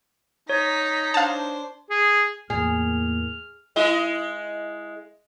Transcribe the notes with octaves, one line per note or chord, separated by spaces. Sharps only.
D#4 C#5 A#5 B6
D4 C5 F5 A5
G#4
E2 A2 A#3 G#4 F6
G#3 E4 D#5